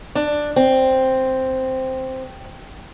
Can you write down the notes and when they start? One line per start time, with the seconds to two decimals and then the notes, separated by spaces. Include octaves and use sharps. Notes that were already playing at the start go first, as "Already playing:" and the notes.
0.15 D4
0.56 C4